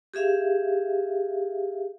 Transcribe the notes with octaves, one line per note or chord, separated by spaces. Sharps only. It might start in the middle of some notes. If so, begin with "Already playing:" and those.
G4 G#4 E5 F5